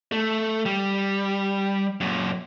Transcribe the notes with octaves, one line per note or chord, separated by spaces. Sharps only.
A3
G3
F#2 A#2